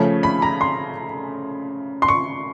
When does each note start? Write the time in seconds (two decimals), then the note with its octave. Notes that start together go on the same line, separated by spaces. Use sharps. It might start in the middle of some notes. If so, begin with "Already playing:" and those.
Already playing: C#3 F3 A3 C#4
0.23 B5
0.42 A#5
0.61 C6
2.02 C6
2.08 C#6